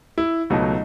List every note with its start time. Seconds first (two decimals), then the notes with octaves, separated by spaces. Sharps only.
0.18 E4
0.50 C#2 B2 F#3 A3 D#4